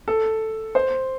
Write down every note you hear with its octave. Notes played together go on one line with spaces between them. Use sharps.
A4
C5